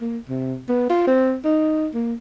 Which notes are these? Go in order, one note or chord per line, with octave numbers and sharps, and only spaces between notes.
A#3
C3
B3
F4
C4
D#4
A#3